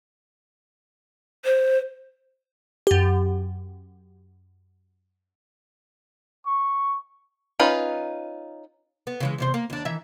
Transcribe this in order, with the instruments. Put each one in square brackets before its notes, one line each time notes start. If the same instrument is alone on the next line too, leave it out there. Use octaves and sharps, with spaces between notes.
[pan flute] C5
[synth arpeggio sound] F#2 G4
[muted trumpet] C#6
[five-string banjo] C#4 D#4 F4 B4
[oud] B3
C#3 E3 G#3
E2 C3 C5
A#3
D#2 D4
D#3 E3 E5